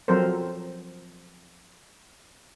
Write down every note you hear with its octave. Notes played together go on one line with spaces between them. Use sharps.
F3 F#3 C4 A4 A#4 C5